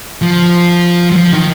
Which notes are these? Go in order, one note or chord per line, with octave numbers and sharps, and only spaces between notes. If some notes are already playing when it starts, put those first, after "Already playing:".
F3
F#3
F3
D#3